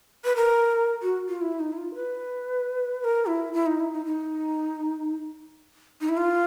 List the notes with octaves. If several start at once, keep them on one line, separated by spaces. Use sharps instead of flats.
B4
A#4
F#4
F4
E4
D#4
E4
F4
B4
B4
A#4
E4
E4
D#4
E4
D#4
D#4
D#4
E4
F4